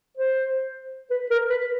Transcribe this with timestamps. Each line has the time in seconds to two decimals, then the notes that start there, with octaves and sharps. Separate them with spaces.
0.17 C5
1.11 B4
1.30 A#4
1.50 B4